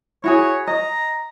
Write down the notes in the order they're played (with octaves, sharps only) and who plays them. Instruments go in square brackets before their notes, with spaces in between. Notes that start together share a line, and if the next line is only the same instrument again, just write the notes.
[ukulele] E4 F#4 G#4 [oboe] C#5
[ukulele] D#5 [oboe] A#5